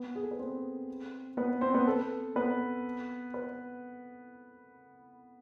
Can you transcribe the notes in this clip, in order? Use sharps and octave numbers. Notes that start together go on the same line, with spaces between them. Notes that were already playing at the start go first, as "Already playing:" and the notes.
Already playing: B3 B4
G#4
A4
B4
C4 C5
B3 B4
C4 C5
B3 B4
A4
B3 B4
B4